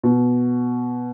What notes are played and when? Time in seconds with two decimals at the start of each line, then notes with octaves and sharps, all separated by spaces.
0.03 B2